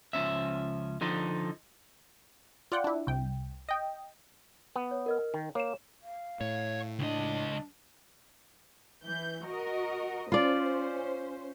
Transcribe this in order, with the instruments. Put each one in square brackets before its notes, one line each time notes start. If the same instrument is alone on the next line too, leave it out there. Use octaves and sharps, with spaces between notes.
[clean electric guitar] C#2 F3 C4 C#4 E5
D3 F3 D#4
[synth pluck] F4 D5 F#5 G5
D4 E4
C2 G5
D#5 G5
[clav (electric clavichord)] B3
[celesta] C#5
A#4 D#5 F6
[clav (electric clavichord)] D#3
[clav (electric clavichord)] A#3 [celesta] C#5 E7
[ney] F5
[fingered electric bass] A2 [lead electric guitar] C#5
[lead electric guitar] C#2 D#5 [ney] D4
[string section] E3 G6
F#4 A#4 D#5
[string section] C#4 C5 [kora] F4 D5